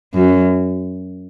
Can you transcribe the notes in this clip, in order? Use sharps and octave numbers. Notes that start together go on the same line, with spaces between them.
F#2